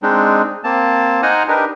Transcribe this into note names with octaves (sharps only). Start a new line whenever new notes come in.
G#3 C4 D4 D#4
A#3 C4 A5
D#4 C5 F#5 G#5 A#5 F6
D4 D#4 G4 A#4 B4